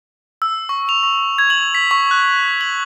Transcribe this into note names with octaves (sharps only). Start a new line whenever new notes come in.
E6
C#6
F7
C#6
G#6
F#7
B6
C#6
F#6
F#7